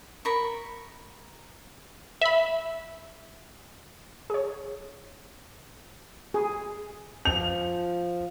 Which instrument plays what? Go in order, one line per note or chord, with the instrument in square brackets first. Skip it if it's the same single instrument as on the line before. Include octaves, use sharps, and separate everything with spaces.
[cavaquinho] A#4 B5 C#6
[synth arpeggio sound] E5 B5
G#4 C#5
[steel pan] G#4
[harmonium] F3 [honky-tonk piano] F7